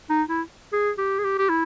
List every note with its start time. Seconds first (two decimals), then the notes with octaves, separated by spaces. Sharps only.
0.10 D#4
0.28 E4
0.73 G#4
0.98 G4
1.19 G#4
1.24 G4
1.39 G4
1.49 E4